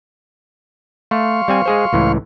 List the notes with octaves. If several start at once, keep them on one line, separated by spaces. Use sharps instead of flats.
A3 F5 C6 C#6
G3 C4 G#5
G#3 G#4 C5
C#2 A2 E3